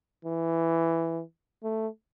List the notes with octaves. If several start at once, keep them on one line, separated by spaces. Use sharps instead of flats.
E3
A3